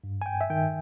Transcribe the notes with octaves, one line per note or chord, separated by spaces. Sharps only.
G2
G#5
G5
E5
D#3 G5